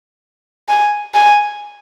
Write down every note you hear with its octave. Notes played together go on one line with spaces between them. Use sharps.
G#5
G#5